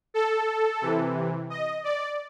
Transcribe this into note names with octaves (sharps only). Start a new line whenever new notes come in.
A4
C3 E3
D#5
D5